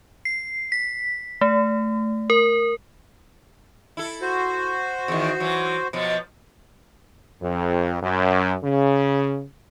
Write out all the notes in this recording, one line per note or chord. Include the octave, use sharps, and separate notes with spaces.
C7
B6
A3
A#4
E4 A4
F#4 C5
E2 D#3
E3 F#3
B2 F3 F#3
F2
F#2
C#3